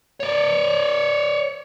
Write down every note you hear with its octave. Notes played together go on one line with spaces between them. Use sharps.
C#5 D5